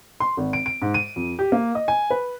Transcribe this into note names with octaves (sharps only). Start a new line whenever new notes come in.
C6
G#1
D7
D7
G#2
D#7
F2
G4
A#3
D#5
G#5
B4